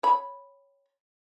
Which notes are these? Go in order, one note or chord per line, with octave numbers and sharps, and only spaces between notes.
C#5 B5